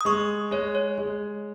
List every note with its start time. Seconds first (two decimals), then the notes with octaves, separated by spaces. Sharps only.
0.01 D#6
0.05 G#3 C#6
0.51 G#3 C#5
0.75 C#5
0.98 G#3